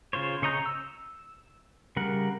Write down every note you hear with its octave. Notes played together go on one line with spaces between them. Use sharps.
C#3 F4 C5 C#5
C#3 C#5 D#5 A#5 G6
E6
C#3 G3 A#4 F#5